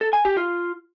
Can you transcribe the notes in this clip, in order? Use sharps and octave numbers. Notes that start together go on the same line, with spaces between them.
A4
G#5
G4
F4